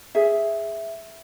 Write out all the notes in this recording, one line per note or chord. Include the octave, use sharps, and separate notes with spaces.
G#4 E5